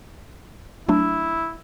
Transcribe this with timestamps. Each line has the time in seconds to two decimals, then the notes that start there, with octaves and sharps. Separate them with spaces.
0.89 F#3 A3 D4 E4